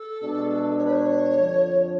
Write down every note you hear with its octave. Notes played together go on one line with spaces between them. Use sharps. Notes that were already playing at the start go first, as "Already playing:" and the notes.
Already playing: A4
B2 G#3 D4
C#5
B4
C#5
F2 D3 F3